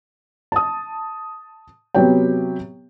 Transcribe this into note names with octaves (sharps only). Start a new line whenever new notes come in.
A5 D#6
C3 F#3 B3 G4 C#5 G5